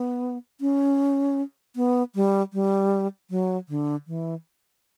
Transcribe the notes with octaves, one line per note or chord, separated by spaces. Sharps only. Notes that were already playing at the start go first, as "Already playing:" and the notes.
Already playing: B3
C#4
B3
G3
G3
F#3
D3
E3